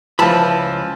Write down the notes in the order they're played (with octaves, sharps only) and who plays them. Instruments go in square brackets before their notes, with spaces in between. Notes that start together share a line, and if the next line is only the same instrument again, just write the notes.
[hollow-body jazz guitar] C#2 A5 B5 [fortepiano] E3 F3